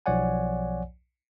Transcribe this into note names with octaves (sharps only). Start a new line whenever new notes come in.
B1 F3 C#5 D5 F#5 G#5